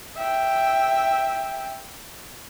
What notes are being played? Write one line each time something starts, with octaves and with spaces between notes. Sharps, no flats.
E5 G5